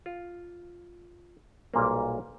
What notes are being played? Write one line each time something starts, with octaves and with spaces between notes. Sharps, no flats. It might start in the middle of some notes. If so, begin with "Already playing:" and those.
F4
B1 A#2 G3 A#3